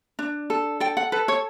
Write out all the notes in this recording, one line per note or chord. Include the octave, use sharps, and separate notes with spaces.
D4
A4
A4 G5
F#5
A4 B4
C#5